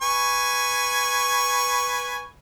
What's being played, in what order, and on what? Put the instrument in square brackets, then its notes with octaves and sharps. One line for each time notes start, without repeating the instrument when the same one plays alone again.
[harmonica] B4 G#5 C#6